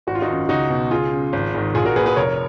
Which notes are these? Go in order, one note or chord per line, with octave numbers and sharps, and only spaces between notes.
G#1 F#4
F4
D#4 F#4
F#2 D#3
C#2 D#4 F#4
B2
C#2 F4 G#4
C#3
G#1
G#2 D#3
A#1 F4 G#4
F#4 A#4
A#2 G#4 B4
G#4 B4
F1 A#4 C#5